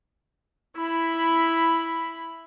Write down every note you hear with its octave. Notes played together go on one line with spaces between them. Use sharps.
E4 B5